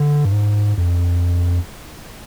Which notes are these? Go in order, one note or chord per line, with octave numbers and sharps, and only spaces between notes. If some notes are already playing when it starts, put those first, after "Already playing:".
Already playing: D3
G2
G#2
F2